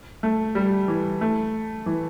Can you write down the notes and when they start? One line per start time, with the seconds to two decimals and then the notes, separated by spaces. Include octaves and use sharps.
0.23 A3
0.55 G3
0.88 E3
1.21 A3
1.86 E3